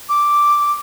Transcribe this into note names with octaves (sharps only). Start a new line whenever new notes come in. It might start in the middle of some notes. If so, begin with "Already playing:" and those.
D6